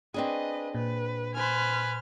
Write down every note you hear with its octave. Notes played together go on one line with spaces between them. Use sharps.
C4 D4 G#4 B4 D#5
A#2 B4
B4 C5 G#5 F6